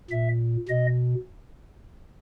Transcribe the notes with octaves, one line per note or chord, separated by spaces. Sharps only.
A#2 E5
B2 D#5